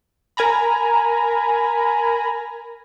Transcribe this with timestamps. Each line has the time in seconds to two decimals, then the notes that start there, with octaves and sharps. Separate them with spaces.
0.37 A#4 G#5 A#5 B5